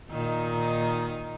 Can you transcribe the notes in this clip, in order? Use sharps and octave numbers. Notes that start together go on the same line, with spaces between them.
A#2 D#3 D#4